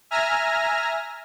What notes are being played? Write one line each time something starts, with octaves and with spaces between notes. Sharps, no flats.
E5 G#5 A#5 F6 A#6